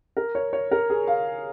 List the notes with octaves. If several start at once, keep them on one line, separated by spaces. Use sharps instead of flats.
A#4
C#5
C#5
A#4
G#4
F5